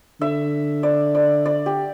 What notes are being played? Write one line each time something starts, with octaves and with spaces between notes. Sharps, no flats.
D3 E5
D5
D5
D5
G4